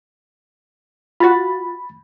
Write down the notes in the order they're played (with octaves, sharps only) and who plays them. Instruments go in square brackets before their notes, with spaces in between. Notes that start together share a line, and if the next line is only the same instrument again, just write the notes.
[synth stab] F4 F#4 [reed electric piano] B5 A6